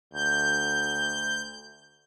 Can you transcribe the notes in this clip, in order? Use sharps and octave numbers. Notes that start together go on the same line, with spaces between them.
D2 G6